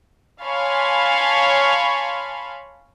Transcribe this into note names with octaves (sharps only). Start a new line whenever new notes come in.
C#5 F5 G#5 A5 B5 C6